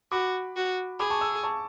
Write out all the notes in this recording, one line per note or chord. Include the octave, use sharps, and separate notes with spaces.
F#4 B5 D6
F#4
G#4 B5 D6
A5 C#6
C#6 E6
A5 C#6